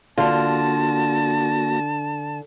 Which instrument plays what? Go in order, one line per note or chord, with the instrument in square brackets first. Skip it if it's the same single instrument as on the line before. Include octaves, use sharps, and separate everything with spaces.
[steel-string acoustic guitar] D3 [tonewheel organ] A#3 F#4 A#6 [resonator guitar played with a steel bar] F4 [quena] A5